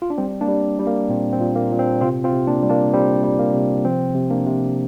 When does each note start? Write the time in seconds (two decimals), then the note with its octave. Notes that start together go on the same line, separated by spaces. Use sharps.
0.02 F4
0.10 D4
0.18 G3 C4
0.41 A#3 D4
0.48 G3
0.79 G3
0.87 A#3
1.09 A#2 C4
1.33 C4
1.40 A#2
1.55 A#3
1.72 A#2
1.79 C4
2.01 C3 C4 F4
2.24 C4 F4
2.33 C3
2.47 A#3 D4
2.63 G3
2.70 A#3 D4
2.93 G3 C4
3.24 G3
3.39 A#3
3.54 C3
3.85 F3 C4
4.15 C3
4.30 A#3 D4
4.46 C3